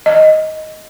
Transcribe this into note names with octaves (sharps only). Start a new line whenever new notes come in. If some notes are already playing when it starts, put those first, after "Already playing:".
D#5